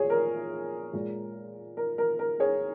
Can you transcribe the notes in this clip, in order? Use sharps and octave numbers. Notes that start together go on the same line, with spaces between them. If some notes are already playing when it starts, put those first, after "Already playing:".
Already playing: A#2 G#4 C#5
A#4
A#2 G#3
A#4
A#4
A#4
G#4 C#5